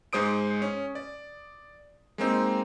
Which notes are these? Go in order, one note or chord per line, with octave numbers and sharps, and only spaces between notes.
G#2 G#3 C5 D#6 D7
C#4
D5
G#3 A#3 C4 D#4